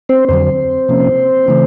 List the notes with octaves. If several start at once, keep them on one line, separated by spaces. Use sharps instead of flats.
C4 C5
F2 D3 F#3 C4 C5
C3 F3 A#3 C#4
C#3 E3 A3 C4